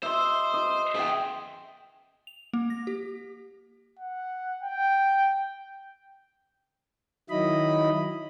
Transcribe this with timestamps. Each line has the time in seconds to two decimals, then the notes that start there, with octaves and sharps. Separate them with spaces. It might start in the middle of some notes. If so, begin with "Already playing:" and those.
0.03 C5 D#5 E5 C6
0.54 D#5
0.95 G#4 D#5 E5 G5
2.27 F7
2.53 A#3
2.70 A#6
2.87 G4
3.99 F#5
4.63 G5
7.30 D#3 F#3 E4 D#5 B5